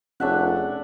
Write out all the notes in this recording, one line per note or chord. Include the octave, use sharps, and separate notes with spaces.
F1 C#4 D4 G#4 C#5 E5 F#5